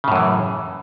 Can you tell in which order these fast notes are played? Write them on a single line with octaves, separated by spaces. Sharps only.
C#3 A2 F#2 E3